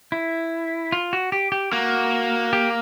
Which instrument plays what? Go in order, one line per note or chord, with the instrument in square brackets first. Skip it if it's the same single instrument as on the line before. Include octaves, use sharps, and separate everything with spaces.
[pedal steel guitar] E4
F4
F#4
G4
G4
[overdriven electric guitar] A#3 [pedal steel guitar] F#4
[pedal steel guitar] G4